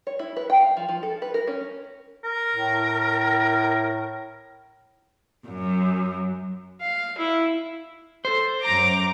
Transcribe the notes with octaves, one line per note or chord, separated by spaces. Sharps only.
C#5
E4
B4
G5
F5
F3
F3
A4
B4
A#4
C#4
A#4
A2
F#2
F5
E4
A4 C5
F#2 A#5 D6